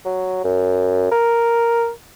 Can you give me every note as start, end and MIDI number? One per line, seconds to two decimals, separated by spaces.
0.05 0.41 54
0.44 1.08 42
1.11 1.89 70